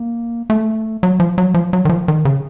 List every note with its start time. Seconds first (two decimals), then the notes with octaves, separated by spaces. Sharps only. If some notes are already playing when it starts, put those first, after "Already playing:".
Already playing: A#3
0.50 A3
1.03 F#3
1.20 F3
1.38 F#3
1.54 F3
1.73 F#3
1.85 D#3
1.89 F3
2.08 D#3
2.25 C#3